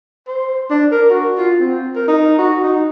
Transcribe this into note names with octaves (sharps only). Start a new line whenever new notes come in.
C5
D4
A#4
F#4
F4
C4
A#4
D#4
F#4
D#4